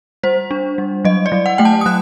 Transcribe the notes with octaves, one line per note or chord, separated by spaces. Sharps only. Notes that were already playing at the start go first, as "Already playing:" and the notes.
G3 C5
D4
G3
F#3 D#5
D5
F#3
F#5
A3 G5
A5
D#6
F#3 F#6